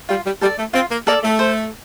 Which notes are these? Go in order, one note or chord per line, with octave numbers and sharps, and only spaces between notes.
G3 F4
G3
G3 A4 D5
A3
C4 F4
A#3
A#3 A4 D5
A3
C5